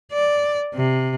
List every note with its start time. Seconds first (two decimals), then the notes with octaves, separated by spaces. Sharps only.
0.12 D5
0.74 C3